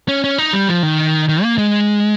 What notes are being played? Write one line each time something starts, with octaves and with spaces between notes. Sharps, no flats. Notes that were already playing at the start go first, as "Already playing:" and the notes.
C#4
C#4
D#4
G3
F3
D#3
D#3
A#3
G#3